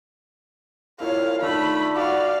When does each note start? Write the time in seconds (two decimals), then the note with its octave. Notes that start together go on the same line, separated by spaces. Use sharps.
1.00 C2 E4 F4 C#5 F5
1.42 D#3 A3 D4 F4 B5
1.96 F#4 D5 F5